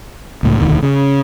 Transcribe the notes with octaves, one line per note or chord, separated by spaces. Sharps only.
C#2 A2
E1 D2 D#3
C#3